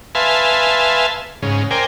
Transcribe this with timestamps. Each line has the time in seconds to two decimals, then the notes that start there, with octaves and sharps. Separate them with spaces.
0.15 B4 E5 F5 G#5 A5 C6
1.42 G#2 C#3
1.71 A#4 C5 D5 G5 G#5